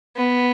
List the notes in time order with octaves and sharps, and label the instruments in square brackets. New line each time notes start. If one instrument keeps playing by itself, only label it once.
[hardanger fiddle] B3